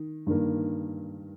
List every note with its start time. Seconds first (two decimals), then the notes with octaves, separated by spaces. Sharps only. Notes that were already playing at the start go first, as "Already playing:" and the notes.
Already playing: D#3
0.27 G2 D#3 A#3